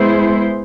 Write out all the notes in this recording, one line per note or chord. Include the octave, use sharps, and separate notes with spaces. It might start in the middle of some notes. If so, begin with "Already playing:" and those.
Already playing: G#3 B3 E4 G#4 C5